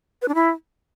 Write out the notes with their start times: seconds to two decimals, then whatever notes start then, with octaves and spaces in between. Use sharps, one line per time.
0.22 B4
0.28 D4
0.35 E4